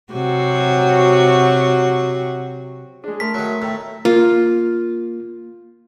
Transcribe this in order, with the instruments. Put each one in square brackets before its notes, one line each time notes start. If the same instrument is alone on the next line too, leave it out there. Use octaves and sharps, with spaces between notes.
[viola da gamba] C3 F#3 F#4
[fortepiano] G#3 D4 [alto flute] G#4
[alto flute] A3 [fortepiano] A#4 A5 C6 [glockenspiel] B6
[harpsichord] D#3 F#3
[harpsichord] A2 [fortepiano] G5 A#5 E6
[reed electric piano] A#3 [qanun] F4